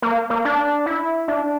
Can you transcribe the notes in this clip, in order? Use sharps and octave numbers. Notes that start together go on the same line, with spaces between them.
A#3
A#3
D4
E4
D4